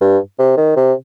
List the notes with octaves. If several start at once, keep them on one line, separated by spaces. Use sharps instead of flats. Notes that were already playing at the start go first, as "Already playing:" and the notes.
G2
C3
D#3
C3